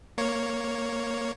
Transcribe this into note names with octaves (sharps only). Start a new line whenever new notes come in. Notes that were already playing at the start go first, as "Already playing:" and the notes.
A#3 C#5